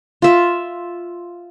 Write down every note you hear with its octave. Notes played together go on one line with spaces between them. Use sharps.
F4 E5